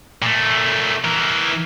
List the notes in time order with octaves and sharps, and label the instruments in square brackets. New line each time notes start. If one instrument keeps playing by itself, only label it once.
[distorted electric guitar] A#2 A3
E3 A#4